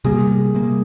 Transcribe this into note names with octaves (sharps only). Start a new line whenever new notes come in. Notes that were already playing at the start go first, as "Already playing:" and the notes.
C3 G3 A#3 G#4
C3 G3 A#3